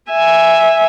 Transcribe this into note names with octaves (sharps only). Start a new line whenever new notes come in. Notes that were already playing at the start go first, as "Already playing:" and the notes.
E5 G#5